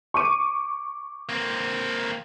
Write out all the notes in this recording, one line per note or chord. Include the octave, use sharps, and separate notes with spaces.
C#6 D6 D#7
A#3 C4